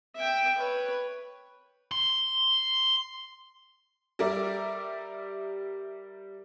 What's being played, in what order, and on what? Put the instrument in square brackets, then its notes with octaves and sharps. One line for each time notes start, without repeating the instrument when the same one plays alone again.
[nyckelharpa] E5 G5
B4 C#5
[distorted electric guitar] C6
[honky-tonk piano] G3 A#4 D5 E5